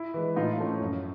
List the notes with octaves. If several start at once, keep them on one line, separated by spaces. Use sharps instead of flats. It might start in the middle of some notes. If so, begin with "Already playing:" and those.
Already playing: E4
E3 G#3
A2 D#4 F4
F3 A3 C#4
F#2